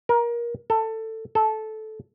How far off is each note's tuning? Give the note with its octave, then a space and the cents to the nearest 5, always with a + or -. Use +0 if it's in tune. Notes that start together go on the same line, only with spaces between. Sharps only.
A#4 +25
A4 +15
A4 -15